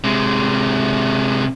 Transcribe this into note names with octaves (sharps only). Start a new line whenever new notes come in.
C3 G#3